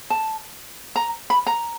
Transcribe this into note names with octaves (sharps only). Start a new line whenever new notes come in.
A5
A#5
B5
A#5